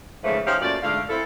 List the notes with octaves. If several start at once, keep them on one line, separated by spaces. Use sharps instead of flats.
G#2 C#3 E3 F3 A3
F3 C#4 D#4 G4 F5
F#2 A#2 A3 D5
G#2 D3 A3 F5
C4 E4 A4